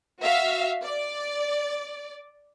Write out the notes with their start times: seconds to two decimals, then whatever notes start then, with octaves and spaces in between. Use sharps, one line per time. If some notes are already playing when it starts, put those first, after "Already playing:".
0.21 F#4 E5 F5
0.83 D5